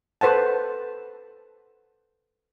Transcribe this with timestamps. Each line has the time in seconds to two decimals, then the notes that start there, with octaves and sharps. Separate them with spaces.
0.21 A4 B4 C5 F#5 A5